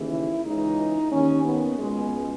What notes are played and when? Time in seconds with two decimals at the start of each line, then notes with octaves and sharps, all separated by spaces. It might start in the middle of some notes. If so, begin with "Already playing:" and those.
Already playing: D#2 C#3 E3
0.11 E4
0.44 C#2 C#3 E3 D#4
1.11 D#2 D#3 C#4
1.45 B3
1.78 C#2 B2 G#3